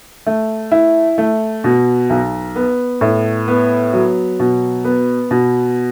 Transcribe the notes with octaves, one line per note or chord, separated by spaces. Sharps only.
A3
E4
A3
B2
B1
B3
A2
B3
F#3
B2
B3
B2